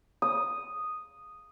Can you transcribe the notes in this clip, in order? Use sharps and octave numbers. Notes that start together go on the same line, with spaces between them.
D#6